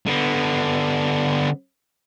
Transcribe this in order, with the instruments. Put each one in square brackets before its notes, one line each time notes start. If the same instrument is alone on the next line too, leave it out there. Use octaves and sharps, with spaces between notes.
[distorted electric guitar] D3 B3